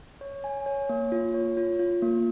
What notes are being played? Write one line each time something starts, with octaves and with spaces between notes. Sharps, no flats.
C#5
G#5
C#5
A#3
F4
C#5
F4
F4
A#3